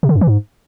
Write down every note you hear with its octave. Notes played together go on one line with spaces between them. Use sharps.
C3
D3
F#2
E3
G#2